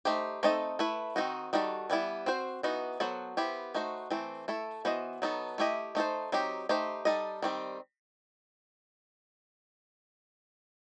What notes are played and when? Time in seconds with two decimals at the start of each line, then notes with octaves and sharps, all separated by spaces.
0.05 A3 D#4 G4 C5
0.43 A3 C4 D#4 A4 D#5
0.79 A3 E4 B4
1.16 D#3 G3 C4 D#4 F#4
1.53 D#3 G3 D#4 F#4 A4
1.90 E3 G3 B3 E4
2.26 C4 F#4 C5
2.63 E3 B3 D#4 F#4
3.00 F#3 B3 F#4 A4 C5
3.37 B3 E4 G4 C5
3.74 A3 D#4 F#4 C5
4.11 E3 A3 C4
4.48 A3 E4 A4
4.85 E3 B3 F#4 C5 D#5
5.22 F#3 B3 D#4 A4
5.58 A3 E4 G4 D#5
5.95 A3 D#4 A4 C5
6.32 F#3 C4 D#4 G4
6.69 A3 D#4 G4 C5
7.05 G3 D#4 A4 D#5
7.42 D#3 G3 C4